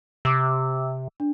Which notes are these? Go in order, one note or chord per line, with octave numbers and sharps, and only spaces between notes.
C3 D6 E6
D4